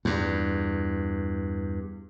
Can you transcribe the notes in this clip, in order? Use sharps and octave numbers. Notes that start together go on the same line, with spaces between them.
E2 G2